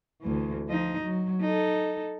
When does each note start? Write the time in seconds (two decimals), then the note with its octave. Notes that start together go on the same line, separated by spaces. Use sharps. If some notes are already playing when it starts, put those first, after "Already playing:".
0.22 D2 E3
0.69 F3 D#4
1.02 F#3
1.41 D#4 A4